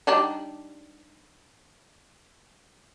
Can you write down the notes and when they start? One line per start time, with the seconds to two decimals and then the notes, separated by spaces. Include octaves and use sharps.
0.07 G3 D4 D#4